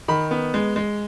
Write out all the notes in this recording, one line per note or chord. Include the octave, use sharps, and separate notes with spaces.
D#3 B5
B3
G#3
G#3